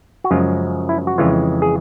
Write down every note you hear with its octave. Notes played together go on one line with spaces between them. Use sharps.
F#4
F#2 C#3 F3 G#3 F4
E4
F#4
F2 C#3 E3 G#3 F4
G#4